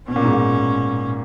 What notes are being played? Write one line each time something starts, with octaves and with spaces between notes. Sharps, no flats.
B2 C#4
A#2
G#2
A#2